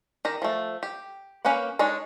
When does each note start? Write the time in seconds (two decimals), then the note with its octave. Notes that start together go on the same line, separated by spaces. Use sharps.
0.25 D#3 G4 A#5
0.42 F3 A3
0.83 G4
1.45 A#3 C#4 G4 B4 F#5
1.79 G#3 D4 D#4 C#5